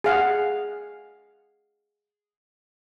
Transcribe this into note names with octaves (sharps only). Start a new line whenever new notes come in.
G#4 F5 F#5